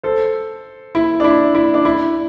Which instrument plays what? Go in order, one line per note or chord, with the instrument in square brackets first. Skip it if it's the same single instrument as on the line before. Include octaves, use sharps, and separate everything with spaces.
[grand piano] A4 C5
E4
D4
E4
E4
D4
E4